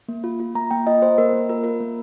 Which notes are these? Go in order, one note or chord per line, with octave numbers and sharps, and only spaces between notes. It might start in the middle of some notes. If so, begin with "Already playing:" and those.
A#3
F4
F4
A#3 A#5
A#3 G5
F4 D#5
F4 C5
A#3 A#4
A#3
F4 A#4
F4 A#4
A#3